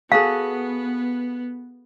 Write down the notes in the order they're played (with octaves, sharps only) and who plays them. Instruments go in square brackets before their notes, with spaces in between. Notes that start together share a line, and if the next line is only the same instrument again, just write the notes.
[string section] B3 [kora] F#4 G#4 A4 [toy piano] F5